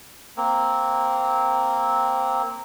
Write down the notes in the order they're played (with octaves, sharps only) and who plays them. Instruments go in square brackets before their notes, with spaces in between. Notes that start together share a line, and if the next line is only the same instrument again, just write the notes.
[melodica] A#3 C4